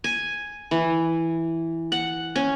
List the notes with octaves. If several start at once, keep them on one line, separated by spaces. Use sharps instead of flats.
G#5
E3
F#5
C#4